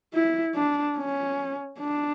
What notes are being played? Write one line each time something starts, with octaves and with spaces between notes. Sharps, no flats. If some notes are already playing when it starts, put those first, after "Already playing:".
E4
D4
C#4
D4